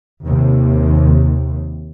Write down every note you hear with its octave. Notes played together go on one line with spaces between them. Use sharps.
D#2 C3